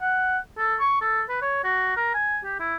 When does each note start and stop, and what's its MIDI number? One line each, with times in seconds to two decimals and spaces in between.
0.01 0.37 78
0.58 0.75 69
0.80 0.97 85
1.02 1.21 69
1.29 1.37 71
1.42 1.63 73
1.64 1.95 66
1.97 2.11 70
2.14 2.39 80
2.44 2.59 67
2.60 2.76 64